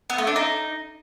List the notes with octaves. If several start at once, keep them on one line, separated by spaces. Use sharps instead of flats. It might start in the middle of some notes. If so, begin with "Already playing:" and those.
B3
A3
D4
D#4